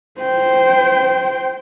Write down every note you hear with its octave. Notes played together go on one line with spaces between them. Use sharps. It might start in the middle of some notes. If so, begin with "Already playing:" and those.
C5 G5